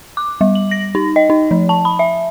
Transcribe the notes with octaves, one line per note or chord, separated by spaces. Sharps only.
D6
G3
F#7
A#6
D#4
D#5
D#4
F3
A5
B5
E5